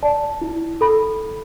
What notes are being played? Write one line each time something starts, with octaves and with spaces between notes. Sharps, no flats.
D5 A5
E4
A4 B5